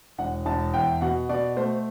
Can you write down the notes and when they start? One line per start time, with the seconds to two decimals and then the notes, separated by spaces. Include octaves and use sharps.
0.18 E1 F#5
0.46 E1 A5
0.74 E2 G5
1.01 B2 F#5
1.29 B2 D5
1.56 A3 C5